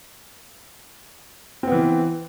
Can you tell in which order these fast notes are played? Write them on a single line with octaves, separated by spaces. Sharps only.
C4 B3 E3